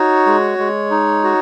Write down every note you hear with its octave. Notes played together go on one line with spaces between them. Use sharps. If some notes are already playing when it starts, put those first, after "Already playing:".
Already playing: D#4 F#4 C#5
G#3
G#3
D#4
F#4